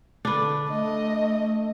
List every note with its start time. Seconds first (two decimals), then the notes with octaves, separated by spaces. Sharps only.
0.25 D3 D4 B4
0.71 A3 D#5